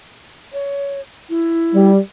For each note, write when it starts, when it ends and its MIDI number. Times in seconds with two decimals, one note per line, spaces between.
0.53 1.01 73
1.30 1.91 64
1.74 1.98 55